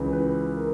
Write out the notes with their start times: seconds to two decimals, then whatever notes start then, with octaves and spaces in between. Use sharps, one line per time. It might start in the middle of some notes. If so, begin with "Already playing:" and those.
Already playing: C#2 C#3 E3
0.13 B4
0.57 A#4